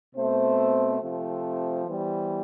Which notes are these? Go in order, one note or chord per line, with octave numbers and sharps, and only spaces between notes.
B2 A3 C4 C5
C3 F3 A3 C4 C5
E3 G3 B3